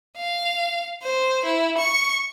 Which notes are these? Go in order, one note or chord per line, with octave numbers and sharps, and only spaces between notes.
F5
C5
E4
C#6